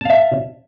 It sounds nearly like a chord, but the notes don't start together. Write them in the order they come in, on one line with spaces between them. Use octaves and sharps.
A5 F5 E5